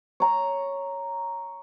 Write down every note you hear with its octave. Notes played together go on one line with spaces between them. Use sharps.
C#5 A#5